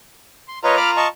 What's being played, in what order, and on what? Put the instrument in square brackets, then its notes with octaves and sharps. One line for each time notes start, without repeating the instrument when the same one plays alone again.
[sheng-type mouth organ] C6
[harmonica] F4 A#5 [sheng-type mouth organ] B4 C#5 D#5
[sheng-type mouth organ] B5 D6 F6
D#5 A5 C#6